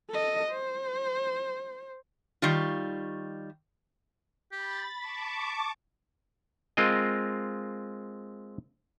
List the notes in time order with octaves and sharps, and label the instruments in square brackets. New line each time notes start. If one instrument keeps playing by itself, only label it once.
[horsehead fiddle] A4 D#5
C5
[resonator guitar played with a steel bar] D#3 G3 F4
[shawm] G4 [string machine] B5 A6
[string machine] A5 C#6 D6 [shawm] B5
[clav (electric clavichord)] G#3 C4 F4 A#4 D#5